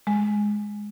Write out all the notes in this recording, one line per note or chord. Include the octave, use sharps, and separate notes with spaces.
G#3